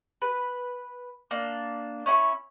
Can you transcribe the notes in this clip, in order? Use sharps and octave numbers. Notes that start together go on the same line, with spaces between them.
B4
A#3 D4
C#4 E4 B5 C#6